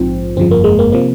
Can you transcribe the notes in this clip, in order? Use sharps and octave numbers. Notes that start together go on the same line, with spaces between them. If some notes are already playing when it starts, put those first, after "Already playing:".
Already playing: A#1 G#2 F3 C4
G1 F2 C#3 F3 C4
A#3
G#3
A#3
C3 F3 A#3